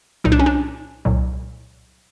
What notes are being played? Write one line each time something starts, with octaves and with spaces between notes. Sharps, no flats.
C2 A#2 F#3 D#4
D4
C#4
D4
C2 A#2 F#3